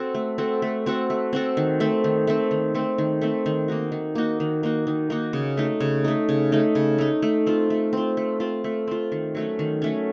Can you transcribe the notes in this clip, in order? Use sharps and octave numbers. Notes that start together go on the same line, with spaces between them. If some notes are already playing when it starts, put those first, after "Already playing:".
Already playing: C4 F#4 A4
A3
C4 F#4 A4
A3
C4 F#4 A4
A3
C4 F#4 A4
D#3
A3 C4
D#3
A3 C4
D#3
A3 C4
D#3
A3 C4
D#3
A#3 D#4 F#4
D#3
A#3 D#4 F#4
D#3
A#3 D#4 F#4
D#3
A#3 D#4 F#4
C#3
A3 D#4
C#3
A3 D#4
C#3
A3 D#4
C#3
A3 D#4
A3
C4 F4
A3
C4 F4
A3
C4 F4
A3
C4 F4
D#3
F#3 A3 C#4
D#3
F#3 A3 C#4